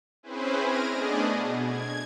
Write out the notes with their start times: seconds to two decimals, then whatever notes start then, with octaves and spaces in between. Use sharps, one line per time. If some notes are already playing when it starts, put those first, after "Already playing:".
0.23 C4 C#4 E4 G#4 B4 C5
0.60 F6 G#6 A#6 D7 D#7
0.91 A3 B3 D4 G#4 D5 D#5
1.29 B2
1.64 G#6